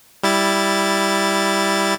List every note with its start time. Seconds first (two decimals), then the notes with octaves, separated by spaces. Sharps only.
0.23 G3 E4 A6